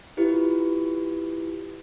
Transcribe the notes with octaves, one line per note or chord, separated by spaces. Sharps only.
E4 F4 G4 B4